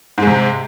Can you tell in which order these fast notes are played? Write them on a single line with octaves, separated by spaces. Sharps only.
G#2 G#3 C3